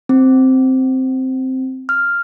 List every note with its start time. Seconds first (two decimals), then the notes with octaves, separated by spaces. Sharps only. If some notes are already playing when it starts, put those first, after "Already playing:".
0.09 C4
1.89 F6